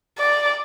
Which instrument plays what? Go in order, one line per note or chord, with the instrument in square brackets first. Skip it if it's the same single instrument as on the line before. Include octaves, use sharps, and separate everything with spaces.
[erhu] D5